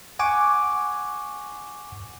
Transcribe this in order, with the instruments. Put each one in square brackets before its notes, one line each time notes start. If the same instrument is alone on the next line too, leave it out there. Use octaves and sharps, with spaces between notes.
[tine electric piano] F#5 G#5 C#6 D6